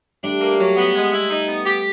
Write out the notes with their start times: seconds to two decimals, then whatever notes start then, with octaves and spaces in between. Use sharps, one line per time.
0.23 G3 A3 D4
0.41 A#3
0.59 F#3
0.76 B3
0.94 G#3
1.12 E4
1.30 D#4
1.48 B3
1.66 G4